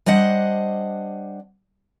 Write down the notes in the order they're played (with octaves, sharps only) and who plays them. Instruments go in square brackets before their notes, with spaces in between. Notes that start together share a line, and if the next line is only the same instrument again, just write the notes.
[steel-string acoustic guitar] G3 D4 C5 D#5 F#5